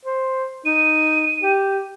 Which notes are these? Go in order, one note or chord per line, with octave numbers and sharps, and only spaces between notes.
C5
D#4 D#7
G4